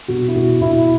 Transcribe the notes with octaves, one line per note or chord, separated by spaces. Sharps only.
B2 F#4
E4
B2 F#4
B2 E4